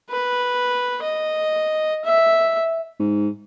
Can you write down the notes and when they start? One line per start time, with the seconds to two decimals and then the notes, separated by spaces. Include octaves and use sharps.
0.11 B4
1.04 D#5
2.05 E5
2.99 G#2